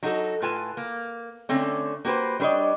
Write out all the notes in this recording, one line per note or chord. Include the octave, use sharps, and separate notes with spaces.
F#3 D#4 F#4 A4
A2 F4 B4 G#5 A5
A#3
D3 A3 C4 C#4
A#3 F#4 G4 B4 C5
G3 D4 B4 C#5 D#5